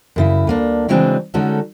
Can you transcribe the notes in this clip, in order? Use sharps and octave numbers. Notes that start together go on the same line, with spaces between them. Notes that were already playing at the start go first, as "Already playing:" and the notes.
F#2 C#3 E4
D2 A#3 D4
C#3 E3 F#3 G#3 C4 D4
D3 G#3 C#4 D#4 F#4 A4